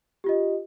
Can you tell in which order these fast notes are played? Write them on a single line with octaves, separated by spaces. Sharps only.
G4 F4 D#5